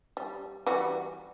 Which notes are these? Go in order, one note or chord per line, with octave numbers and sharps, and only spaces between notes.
G3
E3 G3 F#4